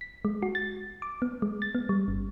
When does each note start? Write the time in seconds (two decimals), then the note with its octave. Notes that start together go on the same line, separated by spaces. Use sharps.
0.01 B6
0.25 G#3
0.42 F#4
0.55 A6
1.02 D6
1.22 B3
1.42 G#3
1.62 A6
1.75 B3
1.89 G3
2.08 G1